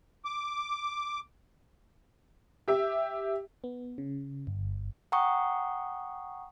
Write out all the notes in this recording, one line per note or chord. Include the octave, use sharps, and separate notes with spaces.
D6
G4 E5
B3
C#3
G1
F#5 G5 A#5 C#6 D#6